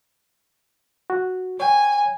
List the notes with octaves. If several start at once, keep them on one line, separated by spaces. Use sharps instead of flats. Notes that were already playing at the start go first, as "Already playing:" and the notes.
F#4
C#5 G5 G#5